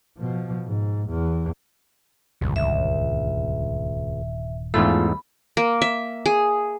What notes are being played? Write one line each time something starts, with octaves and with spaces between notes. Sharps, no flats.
B2 F3
G#2
E2
D#1 C#2 G2 D3
C#2 E5
E2 G#2 A3 F4 B5
A#3
E5
G#4